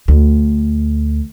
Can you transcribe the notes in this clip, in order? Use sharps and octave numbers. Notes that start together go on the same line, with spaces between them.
D2